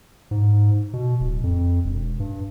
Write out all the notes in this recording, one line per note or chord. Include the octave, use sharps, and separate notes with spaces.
G#2
B2
D1
F2
E1
G2